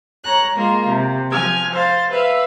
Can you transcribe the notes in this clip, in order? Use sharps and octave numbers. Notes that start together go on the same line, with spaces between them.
C#5 A#5 F#6
G#3 A#3 F4
C3
F3 G#5 F6 G#6
C5 F5 A6
B4 E5 F5